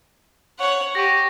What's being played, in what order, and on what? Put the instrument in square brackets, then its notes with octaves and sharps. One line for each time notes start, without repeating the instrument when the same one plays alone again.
[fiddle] C#5 F#5
[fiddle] G4 [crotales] C#6 A#6